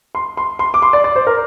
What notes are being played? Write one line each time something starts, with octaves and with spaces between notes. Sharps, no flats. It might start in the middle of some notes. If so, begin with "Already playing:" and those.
C6
C6
C6
D6
C6
D5
D5
C5
A#4